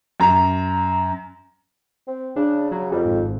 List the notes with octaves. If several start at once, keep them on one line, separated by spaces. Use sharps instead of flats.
F#2 A#5
C4
C#3 D4
F#3
F2 G3
G#1